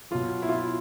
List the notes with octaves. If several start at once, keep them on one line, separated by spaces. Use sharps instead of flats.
B2 F#3 F4
E4
F4
E4